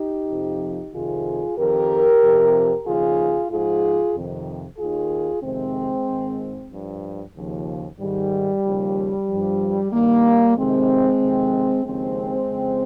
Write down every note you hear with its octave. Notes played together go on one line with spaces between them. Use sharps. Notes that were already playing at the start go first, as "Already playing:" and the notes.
Already playing: D#4 G4
F2 C3 F3
F2 C3 D#3 F4 G#4
F2 D#3 G4 A#4
F2 C3 F3
D#2 C#3 F3 F4 G#4
G#2 F3 F4 G#4
F2 C3 D#3
D#2 D#3 F4 G#4
F2 C3 D#3 G#3 C4
G#2 D#3
G2 F3
D#2 C#3 F3
G#2 D#3 G3
D#2 C#3 F3
G2 F3
G2 D#3 G3 A#3
F2 C3 D#3 G#3 C4
F2 C3 D#3
D#2 C#3 F3 G#3 C4
F2 C#3 F3